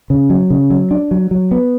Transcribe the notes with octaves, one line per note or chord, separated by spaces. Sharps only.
C#3
F#3
C#3
F#3
D4
F#3
F#3
B3